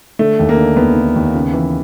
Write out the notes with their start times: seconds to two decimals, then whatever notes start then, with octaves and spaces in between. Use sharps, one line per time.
0.19 D3 A3
0.39 D#2
0.49 A#3
0.57 D3
0.77 D#2 B3
0.96 D3
1.16 D#2
1.35 C#3
1.53 E3